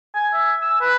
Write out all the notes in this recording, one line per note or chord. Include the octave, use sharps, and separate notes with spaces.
G#5
E5
E6
B4